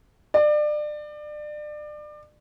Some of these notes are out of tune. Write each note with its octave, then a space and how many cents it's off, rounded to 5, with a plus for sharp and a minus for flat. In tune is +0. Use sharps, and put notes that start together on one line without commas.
D5 +30